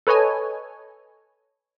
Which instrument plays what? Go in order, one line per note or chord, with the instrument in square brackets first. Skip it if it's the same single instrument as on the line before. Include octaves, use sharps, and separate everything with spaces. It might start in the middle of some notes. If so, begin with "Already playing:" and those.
[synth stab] A4 B4 C#5 D#5 G#5